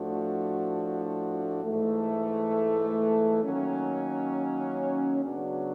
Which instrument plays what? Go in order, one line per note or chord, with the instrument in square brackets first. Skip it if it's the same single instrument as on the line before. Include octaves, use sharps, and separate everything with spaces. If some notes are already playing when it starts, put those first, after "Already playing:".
Already playing: [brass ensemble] A2 F3 A3 D4 F#4
G#2 E3 A3
D#3 F#3 A#3 C#4
C#3 F#3 B3 D4 F#4